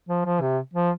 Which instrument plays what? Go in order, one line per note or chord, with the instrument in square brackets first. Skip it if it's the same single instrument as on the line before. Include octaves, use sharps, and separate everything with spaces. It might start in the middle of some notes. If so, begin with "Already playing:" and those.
[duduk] F3
F3
C3
F3